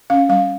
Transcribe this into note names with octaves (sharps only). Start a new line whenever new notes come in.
C#4 F5
G3 F5